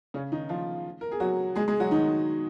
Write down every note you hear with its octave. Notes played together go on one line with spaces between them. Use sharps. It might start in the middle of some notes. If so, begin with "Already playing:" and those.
C#3 C#4
D#3 D#4
F3 F4
A#4
G#4
F#3 F#4
G#3 G#4
G#3 G#4
F#3 F#4
D#3 D#4